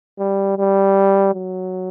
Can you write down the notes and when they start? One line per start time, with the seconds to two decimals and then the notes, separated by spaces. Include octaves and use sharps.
0.19 G3
0.57 G3
1.34 F#3